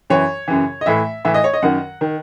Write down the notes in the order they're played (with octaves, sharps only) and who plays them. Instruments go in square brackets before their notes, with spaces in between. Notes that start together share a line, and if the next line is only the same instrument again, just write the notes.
[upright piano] F#2 E3 C#5
F#2 C#3 E3
D#5
A2 E3 E5
A2 E3 E5
D#5
C#5
D#5
F#2 D#3 F#5
D#3